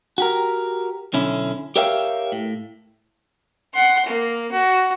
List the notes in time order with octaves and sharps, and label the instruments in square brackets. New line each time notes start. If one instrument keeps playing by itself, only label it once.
[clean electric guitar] F#4 G4 A#4
B1 D3 C#4 E4
G4 A#4 C#5 E5 F5 G5
A2
[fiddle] F#5 C6
A#3
F#4